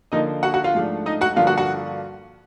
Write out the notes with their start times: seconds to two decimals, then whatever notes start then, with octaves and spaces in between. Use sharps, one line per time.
0.12 D3 F3 A#3 D#4 D#5
0.43 F#4 F#5
0.54 F#4 F#5
0.64 F4 F5
0.74 G#2 F3 A3 D4
1.06 D#4 D#5
1.21 F#4 F#5
1.36 G2 D3 F3 A#3 D4 F4 F5
1.47 F#4 F#5
1.57 F#4 F#5